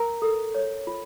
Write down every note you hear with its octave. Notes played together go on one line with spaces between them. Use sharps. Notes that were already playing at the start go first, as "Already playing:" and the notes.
Already playing: A#4 A#5
A4
C#5
F4